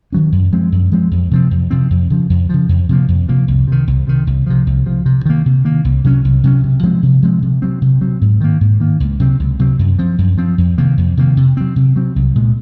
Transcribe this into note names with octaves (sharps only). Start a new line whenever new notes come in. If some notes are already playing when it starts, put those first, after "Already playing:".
D#3 F#3 C#4
F#2
F3 G#3 C4
F#2
F3 G#3 C4
F2
C3 F3 C4
F2
C3 F3 C4
F2
C#3 F3
F2
C#3 F3
F2
C3 F3 A#3
F2
C3 F3 A#3
C2
C3 D#3
C2
C3 D#3
C2
C3 F3
C2
C3 F3
C3
D#3 A#3
C3
D#3 A#3
C2
C3 F#3 C#4
C2
C3 F#3 C#4
C3
F3 G#3 C4
C3
F3 G#3 C4
C3
F#3 C4
C3
F#3 C4
G#2
D#3 A#3
G#2
D#3 A#3
C#2
C3 F#3 C4
C#2
C3 F#3 C4
F#2
F3 C4
F#2
F3 C4
F2
C3 D#3 A#3
F2
C3 D#3 A#3
C3
F#3 C4
C3
F#3 C4
C2
A#2 G#3